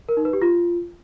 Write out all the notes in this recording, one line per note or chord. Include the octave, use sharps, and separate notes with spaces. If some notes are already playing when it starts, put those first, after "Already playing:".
A#4
D#4
B4
G4
F4